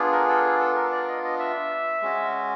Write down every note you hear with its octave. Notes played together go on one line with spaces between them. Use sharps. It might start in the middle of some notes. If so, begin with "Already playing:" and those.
Already playing: B3 D4 F4 G#4
A#4
A4
G#4
A4
A#4
D5
D#5
D#5
E5
G#3 C#4 F#4